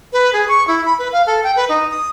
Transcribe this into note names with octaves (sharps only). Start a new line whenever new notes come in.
B4
G#4
C#6
E4
B5
B4
F5
A4
G5
B4
D#4
D#6